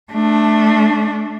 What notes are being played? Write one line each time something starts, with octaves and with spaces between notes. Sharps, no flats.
A3 D4